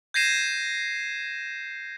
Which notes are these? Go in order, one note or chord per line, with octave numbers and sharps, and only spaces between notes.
G6 G#6 A#6 C7 D#7 E7